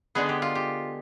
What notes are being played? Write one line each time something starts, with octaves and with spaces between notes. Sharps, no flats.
D3 G#3 B3 G#4
G4
F4
G4